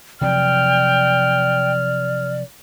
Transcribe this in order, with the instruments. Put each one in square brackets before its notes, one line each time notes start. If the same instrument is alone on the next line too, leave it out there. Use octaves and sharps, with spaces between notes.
[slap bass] C3 F3 F#3 [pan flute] D5 [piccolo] G5 [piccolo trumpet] F6